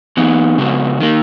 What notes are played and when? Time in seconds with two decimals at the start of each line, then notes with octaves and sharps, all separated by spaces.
0.17 E3 B3 D#4
0.58 C#3 G#3 B3 F#4
1.01 D#3 A#3